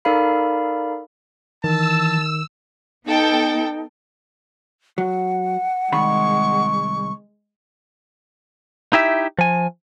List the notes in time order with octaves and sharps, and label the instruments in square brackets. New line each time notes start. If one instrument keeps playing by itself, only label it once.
[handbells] D#4 A4 A#4 D5 F5 B5
[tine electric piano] D#3 [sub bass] E3 [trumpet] A5 [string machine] E6
[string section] B3 A4 G5 [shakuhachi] D#4
[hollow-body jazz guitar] F#3 [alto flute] F#5
[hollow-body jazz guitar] C2 D#3 B5 [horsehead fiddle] G#3 [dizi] C#6
[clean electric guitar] D#4 E4 G4 E5
F3 G#5